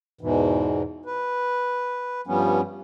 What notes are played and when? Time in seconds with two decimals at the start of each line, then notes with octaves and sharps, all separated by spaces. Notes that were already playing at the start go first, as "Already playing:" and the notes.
0.21 E2 G#2 B2 E3
1.06 B4
2.27 G2 F3 G3 B3 C#4